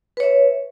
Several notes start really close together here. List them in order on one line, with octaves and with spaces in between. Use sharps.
B4 C#5 E5